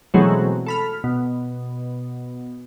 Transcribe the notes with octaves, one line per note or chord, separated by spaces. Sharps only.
B2 E3 F#3 G#3 A3 C4
A4 B5 F6
B2